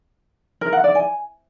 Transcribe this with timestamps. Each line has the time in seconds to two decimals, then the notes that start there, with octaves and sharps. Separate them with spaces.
0.61 A#4
0.73 F#5
0.84 D5
0.95 G#5